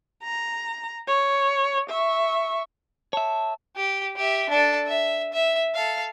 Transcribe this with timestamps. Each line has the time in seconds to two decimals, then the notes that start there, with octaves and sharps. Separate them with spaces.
0.23 A#5
1.08 C#5
1.89 E5 C#6
3.13 C#5 E5 A5
3.76 G4
4.16 G4 E5
4.49 D4 A4
4.87 E5
5.33 E5
5.74 A4 F5